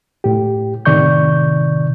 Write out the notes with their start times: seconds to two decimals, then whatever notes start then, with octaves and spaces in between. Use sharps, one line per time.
0.24 A2 G4
0.85 A2 C3 D#3 D5 C#6 G6